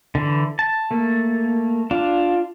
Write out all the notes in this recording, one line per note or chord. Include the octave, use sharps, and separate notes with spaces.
D3 E3
A5
A3 A#3
D4 F4